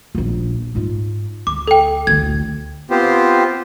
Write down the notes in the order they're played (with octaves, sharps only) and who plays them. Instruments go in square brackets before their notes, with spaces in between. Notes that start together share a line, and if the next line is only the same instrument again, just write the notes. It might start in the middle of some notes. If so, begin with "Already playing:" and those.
[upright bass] D#1 A#1
G#2 F4
[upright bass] D2 [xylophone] D6
[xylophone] A4 G5
[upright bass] A1 D2 [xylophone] G#6
[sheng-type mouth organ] B3 C4 F4 G4 C5